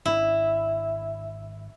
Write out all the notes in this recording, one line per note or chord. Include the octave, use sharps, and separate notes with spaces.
G#1 C3 D4 E4